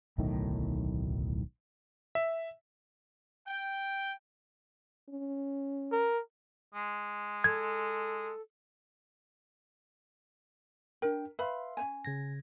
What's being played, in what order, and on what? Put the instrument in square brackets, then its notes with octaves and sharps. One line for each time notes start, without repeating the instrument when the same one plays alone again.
[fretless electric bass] D1 B1 A2 D#3
[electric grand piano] E5
[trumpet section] G5
[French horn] C#4
[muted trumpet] A#4
[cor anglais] G#3
[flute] A4 [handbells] G#6
[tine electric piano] D4 G5 [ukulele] A#4
[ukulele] B4 B5 [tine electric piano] E5 F5 C6
[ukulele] C#4 C5 G#5
[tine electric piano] C#3 G#6 A#6